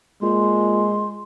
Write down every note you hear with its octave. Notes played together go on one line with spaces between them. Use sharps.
A#2 G#3 C6